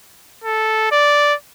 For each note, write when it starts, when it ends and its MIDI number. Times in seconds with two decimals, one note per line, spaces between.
0.44 0.89 69
0.91 1.34 74